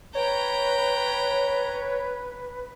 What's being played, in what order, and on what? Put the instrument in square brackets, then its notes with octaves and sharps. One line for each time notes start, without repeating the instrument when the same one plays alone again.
[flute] B4 [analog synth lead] C#5 [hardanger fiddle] G5 A#5